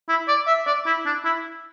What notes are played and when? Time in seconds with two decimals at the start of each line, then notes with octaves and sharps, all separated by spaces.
0.09 E4
0.28 D5
0.47 E5
0.66 D5
0.86 E4
1.06 D4
1.25 E4